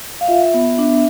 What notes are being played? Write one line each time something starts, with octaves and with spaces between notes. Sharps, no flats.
F5
F4 E5
B3
D4